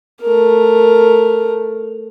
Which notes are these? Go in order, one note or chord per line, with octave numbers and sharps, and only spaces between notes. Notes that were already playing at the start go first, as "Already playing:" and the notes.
A3 A#4